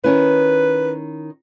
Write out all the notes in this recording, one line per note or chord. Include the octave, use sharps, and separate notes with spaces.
D#3 C#4 E4 B4